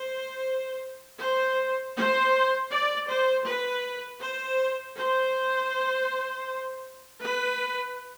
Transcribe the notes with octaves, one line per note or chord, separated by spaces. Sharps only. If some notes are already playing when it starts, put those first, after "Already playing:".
Already playing: C5
C5
C5
D5
C5
B4
C5
C5
B4